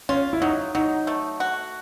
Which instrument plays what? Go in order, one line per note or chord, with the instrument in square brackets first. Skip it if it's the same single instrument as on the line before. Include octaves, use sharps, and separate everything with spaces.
[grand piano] C#4 [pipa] F4
[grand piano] E4
[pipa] F#3 [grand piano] D#4
[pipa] F#3 [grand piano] D#4
[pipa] A3
F#4